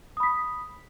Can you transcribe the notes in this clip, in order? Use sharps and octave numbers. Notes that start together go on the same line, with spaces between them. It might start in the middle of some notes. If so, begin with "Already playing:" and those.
B5 D#6 B6